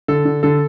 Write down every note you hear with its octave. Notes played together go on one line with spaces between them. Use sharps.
D3 A4
D3
D3 A4